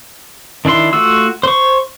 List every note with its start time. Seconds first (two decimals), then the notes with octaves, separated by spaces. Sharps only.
0.65 D#3 D4 E4 C6
0.93 A3 F4 F#4 E6
1.43 C5 C#6